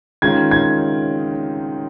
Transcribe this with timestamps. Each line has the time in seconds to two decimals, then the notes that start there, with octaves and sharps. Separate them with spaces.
0.22 D#3 G#3 C#4 F4 G#6
0.51 G#6